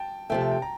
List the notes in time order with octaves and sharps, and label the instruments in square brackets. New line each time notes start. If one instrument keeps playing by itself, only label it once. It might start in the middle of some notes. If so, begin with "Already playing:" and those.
Already playing: [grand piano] G5 A5
[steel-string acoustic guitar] C3 F3 A3 [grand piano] G5
[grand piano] A5
G5
A#5